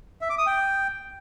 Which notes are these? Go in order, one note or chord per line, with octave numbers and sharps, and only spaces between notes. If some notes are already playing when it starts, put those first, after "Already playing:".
E5
D6
D#6
G5